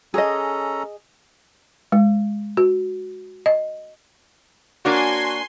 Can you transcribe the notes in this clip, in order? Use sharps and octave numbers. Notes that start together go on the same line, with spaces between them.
C#4 G#4 A4 D#5 A#5
G#3
F#4
D#5
A#3 D4 F#4 C#5 G#5 C6